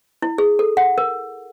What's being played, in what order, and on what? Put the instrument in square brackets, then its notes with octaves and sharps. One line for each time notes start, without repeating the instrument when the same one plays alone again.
[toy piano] E4
G#4
A4
F#5
A#4